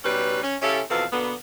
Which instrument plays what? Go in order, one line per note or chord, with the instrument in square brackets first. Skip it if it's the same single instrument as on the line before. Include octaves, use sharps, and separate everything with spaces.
[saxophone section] B2 G3 C#4 D#4 G4 B4
C#4
C#3 C#4 E4 G4 A4
E2 B2 F3 C4 A4 F5
B2 D3 A#3 B3